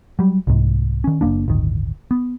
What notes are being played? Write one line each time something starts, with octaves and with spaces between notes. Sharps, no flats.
F#3 G3
C2 G#2
D#3 C#4
F#1 F2 A#3 D4
D1 G1 D#3
B3